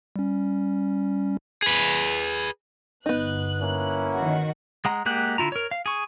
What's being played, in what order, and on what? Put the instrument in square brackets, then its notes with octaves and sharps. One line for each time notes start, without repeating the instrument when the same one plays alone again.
[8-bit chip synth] G3 C#4
[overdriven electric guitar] G#4 B4
[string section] G1 F#6 [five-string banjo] B3 D#4
[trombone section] A#3 C#4 E4
[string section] D#3 F#4
[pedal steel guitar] G#3 F#5 A#5
G#3 A#3 G4 F#5 F#6
D3 E4 F4 A#5
A#4 C#5
F5
G#4 C#6